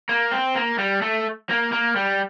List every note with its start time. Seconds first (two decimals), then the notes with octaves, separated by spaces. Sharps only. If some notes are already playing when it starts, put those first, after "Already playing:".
0.09 A#3
0.32 C4
0.56 A#3
0.79 G3
1.02 A3
1.49 A#3
1.72 A#3
1.96 G3